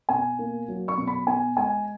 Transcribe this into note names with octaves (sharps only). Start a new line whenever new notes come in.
B2 G#5
A#3
F#3
C#6
B2
B5
B3 G#5
G#3 G#5